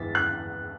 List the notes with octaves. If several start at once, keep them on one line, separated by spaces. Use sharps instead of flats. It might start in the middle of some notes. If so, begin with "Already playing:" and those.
Already playing: E2 A6 B6
F#6